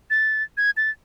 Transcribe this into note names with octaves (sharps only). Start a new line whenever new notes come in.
A6
G#6
A6